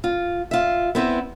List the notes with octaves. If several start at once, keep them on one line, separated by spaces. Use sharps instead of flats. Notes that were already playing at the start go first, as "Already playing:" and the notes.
F4
F4 E5
B3 C4 E4 B4